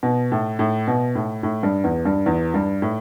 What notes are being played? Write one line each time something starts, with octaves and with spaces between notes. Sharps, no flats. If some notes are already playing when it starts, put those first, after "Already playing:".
B2
A2
A2
B2
A2
A2
G2
E2
G2
E2
G2
A2